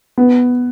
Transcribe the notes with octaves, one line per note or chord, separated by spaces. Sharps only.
B3